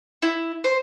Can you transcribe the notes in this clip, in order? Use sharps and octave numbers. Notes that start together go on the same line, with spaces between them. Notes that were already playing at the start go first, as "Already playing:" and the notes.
E4
C5